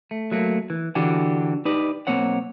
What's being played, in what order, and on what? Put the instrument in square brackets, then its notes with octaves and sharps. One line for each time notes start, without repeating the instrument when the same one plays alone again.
[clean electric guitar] A3
F#3 A3 A#3
E3
D3 E3 D4 F#4 G4
D#4 G4 B4 D5
B1 A#3 C4 C#5 F#5